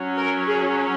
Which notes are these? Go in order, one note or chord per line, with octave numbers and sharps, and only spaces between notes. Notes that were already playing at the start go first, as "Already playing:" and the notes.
Already playing: F#3 C#4
A#4
G#4